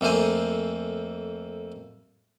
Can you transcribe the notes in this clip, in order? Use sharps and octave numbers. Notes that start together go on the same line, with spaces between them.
F2 A3 A#3 C5 G#5